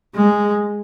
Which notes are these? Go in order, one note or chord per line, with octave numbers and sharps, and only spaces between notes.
G#3